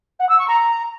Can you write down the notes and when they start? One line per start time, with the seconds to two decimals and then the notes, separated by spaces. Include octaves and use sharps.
0.19 F#5
0.29 E6
0.38 C#6
0.48 A#5